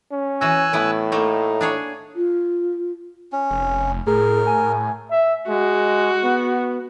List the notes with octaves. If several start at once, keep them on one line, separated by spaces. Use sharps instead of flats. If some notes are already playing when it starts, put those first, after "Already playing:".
C#4
E3 F#4 G#5 E6 F#6
A2 B3 E4
A3 A#3 D#4
D4 G#4 C#5
F4
C#4
F1
A2 G#4 A#4
G#5
E5
G#3 F#4
B3